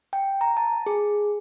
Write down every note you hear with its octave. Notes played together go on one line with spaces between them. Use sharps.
G5
A#5
A5
G#4